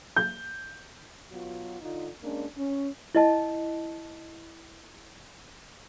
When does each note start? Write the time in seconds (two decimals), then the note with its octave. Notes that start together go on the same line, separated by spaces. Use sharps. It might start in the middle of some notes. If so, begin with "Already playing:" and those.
0.16 G6
1.31 B2 F#3 B3 F4
1.81 D3 D#4 F4
2.22 G#3 A#3 C#4 D4
2.56 C#4
3.15 E4 D#5 A5